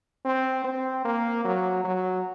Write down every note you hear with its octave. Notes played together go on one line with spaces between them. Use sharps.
C4
C4
A#3
F#3
F#3